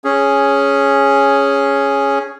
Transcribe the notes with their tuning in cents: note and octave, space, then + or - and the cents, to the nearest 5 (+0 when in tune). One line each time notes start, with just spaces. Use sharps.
C#4 +0 G#4 +0